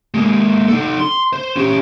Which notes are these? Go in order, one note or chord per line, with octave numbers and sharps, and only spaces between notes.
G#3 A#3
D#4 A4
C6
C5
C#4 G4